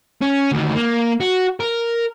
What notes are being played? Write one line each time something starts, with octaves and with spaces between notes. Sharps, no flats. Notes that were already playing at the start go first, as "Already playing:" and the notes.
C#4
D2 D#3
A#3
F#4
A#4